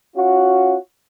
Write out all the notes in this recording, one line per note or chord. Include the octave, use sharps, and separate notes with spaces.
C#4 F4 F#4